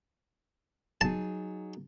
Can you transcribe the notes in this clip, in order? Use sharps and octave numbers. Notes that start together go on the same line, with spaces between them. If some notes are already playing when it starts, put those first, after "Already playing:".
F#3 D#4 G#4 A5